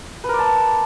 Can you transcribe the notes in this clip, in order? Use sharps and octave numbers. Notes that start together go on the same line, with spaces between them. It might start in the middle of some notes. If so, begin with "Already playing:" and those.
A#4 B4 D5 A5